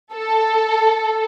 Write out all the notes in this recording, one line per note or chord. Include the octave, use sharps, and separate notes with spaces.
A4